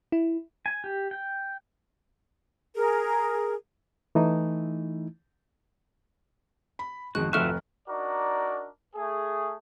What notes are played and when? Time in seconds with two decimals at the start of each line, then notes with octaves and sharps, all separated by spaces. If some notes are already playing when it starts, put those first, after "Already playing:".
0.12 E4
0.66 G#5
0.84 G4
1.11 G5
2.75 G#4 A#4
4.15 E3 A3 D#4 E4
6.79 B5
7.15 G#1 F2 D#3 G#3 F#4 F#6
7.33 F1 A3 F4 F#4 E5 C#6 F6 F#6
7.88 D4 D#4 F#4 A#4 D5
8.95 A3 G#4